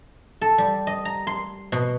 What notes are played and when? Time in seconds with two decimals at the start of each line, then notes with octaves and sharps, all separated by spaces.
0.41 A4
0.58 G3
0.87 D#5
1.05 A#5
1.27 C6
1.72 B2